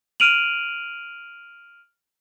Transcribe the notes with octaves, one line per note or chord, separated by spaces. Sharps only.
F6 D7 D#7 F7 F#7